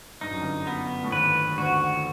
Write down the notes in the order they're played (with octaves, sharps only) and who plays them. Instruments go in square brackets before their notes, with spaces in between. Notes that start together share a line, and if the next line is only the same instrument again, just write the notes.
[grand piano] G2 [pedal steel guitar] D#4
[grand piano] F#2
G1 G2
[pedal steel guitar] B3
[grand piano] A2
[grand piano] G#1 G#2 [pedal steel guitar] B4
[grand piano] D2 D3 [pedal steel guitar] F#4